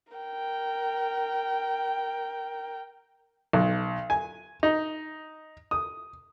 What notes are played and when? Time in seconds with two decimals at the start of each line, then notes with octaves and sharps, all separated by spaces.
0.13 A#4 G5
3.53 B1
4.10 G#5
4.63 D#4
5.71 D#6